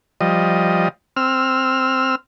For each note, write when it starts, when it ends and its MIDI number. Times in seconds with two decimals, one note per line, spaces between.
0.21 0.88 53
0.21 0.88 55
0.21 0.88 75
1.16 2.15 60
1.16 2.15 88
1.16 2.15 89